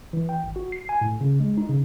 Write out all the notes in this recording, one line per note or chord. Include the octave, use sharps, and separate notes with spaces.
E3
G5
G#1
F#4
C7
G#5
A2
C#3
G#3
D#4
C#3